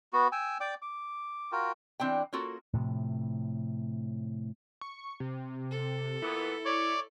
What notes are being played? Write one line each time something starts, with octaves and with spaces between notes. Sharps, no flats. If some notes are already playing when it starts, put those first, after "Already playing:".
B3 F#4
G5 G#5 E6
D5 G5 D6
D6
F4 F#4 A#4 G5
E3 C4 D4 G5
A#3 C#4 F4 F#4 A4 A#4
A2 C3 F3
C#6
C3
A4
A#2 E3 B3 E4
C#5 D5